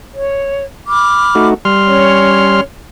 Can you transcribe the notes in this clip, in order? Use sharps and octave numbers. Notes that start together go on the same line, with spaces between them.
C#5
B5 D6 F6
A3 D#4 F#4
G3 C6 F6
C#4 C#5